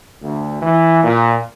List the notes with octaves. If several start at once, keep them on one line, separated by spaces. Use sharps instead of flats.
D2
E3
A#2